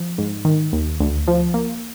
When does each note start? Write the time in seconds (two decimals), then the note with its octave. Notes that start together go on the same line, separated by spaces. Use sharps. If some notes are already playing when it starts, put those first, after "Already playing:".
Already playing: F3
0.18 G#2
0.45 D#3
0.73 D#2
1.00 D2
1.28 F3
1.54 A#3